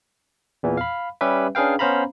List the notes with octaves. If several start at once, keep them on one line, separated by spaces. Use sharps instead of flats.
E2 A#2 E3
F5 B5
G3 C#4 G4 B4 E5
C#4 D4 G#4 B4 F5 G5
B3 C#4 C5 F5 A#5 B5